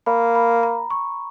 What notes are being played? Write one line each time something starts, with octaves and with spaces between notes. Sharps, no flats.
A#3 B5
B5
A#5
C#6